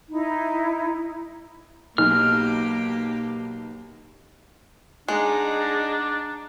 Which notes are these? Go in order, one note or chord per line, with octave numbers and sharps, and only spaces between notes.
D#4 E4
B1 A#3 G4 F6
G#3 D4 D#4 G#4 F#5 A#5